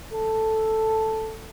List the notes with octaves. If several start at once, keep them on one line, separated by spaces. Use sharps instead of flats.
A4